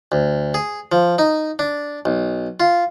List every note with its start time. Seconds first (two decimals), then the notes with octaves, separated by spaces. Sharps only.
0.12 D2
0.54 G#4
0.92 F3
1.18 D#4
1.59 D4
2.05 B1
2.60 F4